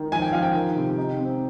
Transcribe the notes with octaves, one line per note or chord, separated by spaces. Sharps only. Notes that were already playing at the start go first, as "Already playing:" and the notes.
Already playing: D#3
F3 G#5
G5
F3 F5
G5
D#3
C3
D#4
C4